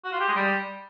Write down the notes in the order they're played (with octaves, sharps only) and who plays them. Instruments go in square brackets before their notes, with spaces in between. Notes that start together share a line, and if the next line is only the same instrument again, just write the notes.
[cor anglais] F#4
F4
G4
G#3
G3